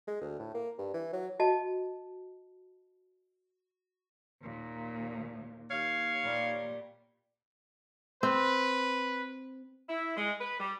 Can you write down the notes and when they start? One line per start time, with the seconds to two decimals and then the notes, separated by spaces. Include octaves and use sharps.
0.08 G#3
0.21 D2
0.39 A2
0.54 A#3
0.78 G2
0.94 E3
1.13 F#3
1.40 F#4 D#5 A5
4.43 D#2 A#2
5.71 D#2 C#5 F5
6.23 A#2 G3
8.23 C4 B4
9.89 E4
10.15 G#3
10.39 B4
10.60 G3